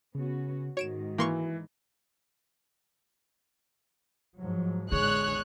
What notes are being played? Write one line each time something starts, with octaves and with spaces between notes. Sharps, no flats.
C#3 B3 C#4 F#4
G#2 D#3 F#4 C#5 D7 E7
E3 A#3 C6 C#6
G#2 F3 F#3
A1 E2 D3 G#3 G#4 C#5 F#6